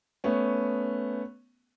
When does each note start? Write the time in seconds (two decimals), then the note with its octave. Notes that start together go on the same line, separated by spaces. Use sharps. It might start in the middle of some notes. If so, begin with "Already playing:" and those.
0.24 A3 B3 C#4